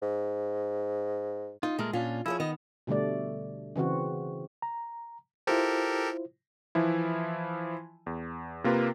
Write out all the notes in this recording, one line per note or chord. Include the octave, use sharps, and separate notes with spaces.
G#2
D#4 F4
A#2 G#3 A3 A#4
A#2 C#4 D4 F4
F3 E4 G#4 C#5
D#3 B3 D#5
B2 D3 G3 A3 D5
C#3 E3 C4 F#4
A#5
E4 F4 G4 A4 A#4 C5
E3 F3 E4
E2
C3 A#3 F4 A#4 B4